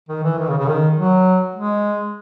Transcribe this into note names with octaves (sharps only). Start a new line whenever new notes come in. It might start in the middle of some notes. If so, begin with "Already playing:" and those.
D#3
E3
D#3
C#3
C#3
D#3
F#3
G#3